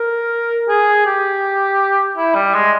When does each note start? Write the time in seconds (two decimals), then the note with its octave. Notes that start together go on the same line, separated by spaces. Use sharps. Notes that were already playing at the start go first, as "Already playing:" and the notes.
Already playing: A#4
0.69 G#4
1.06 G4
2.17 E4
2.35 G3
2.54 G#3